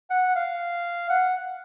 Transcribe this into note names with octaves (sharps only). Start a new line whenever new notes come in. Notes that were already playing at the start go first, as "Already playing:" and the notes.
F#5
F5
F#5